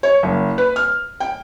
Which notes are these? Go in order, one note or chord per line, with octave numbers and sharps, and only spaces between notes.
C#5
F#1
B4
F6
G5